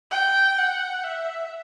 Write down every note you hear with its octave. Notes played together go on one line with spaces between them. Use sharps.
G5
F#5
E5